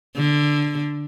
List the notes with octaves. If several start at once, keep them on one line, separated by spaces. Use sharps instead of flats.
D3